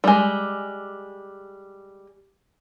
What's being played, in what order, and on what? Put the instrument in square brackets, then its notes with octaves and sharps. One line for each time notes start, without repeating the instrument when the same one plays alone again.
[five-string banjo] G3 G#3